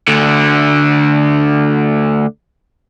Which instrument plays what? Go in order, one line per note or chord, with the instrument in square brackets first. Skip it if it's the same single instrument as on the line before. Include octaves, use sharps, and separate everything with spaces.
[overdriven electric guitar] D2 D3